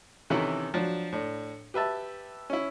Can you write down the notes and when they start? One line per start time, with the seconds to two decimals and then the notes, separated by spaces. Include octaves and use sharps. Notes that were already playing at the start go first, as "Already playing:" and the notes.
0.30 C3 D#3 E3 C#4 E4 A4
0.74 F3 F#3 D4
1.12 A2 D4
1.74 G4 B4 E5 A5
2.50 C#4 E4